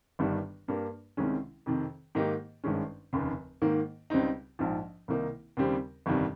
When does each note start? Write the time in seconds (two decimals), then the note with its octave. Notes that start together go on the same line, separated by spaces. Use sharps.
0.19 G1 G2 D#3 G3
0.68 G2 G3 A#3
1.17 C2 C3 D#3 G#3 C#4
1.66 F2 C3 D#3
2.15 G#2 D#3 A#3 D#4 G4
2.64 G#1 G2 D#3 G#3 C#4
3.13 F1 D#2 C#3
3.62 G#2 D#3 A#3
4.10 C#2 C#3 G3 C4 D#4
4.59 A#1 G#2 F3
5.08 C2 C3 D#3 A#3 D#4
5.57 D#2 C#3 G3 C4 G4
6.06 G1 F2 C3 D#3 G3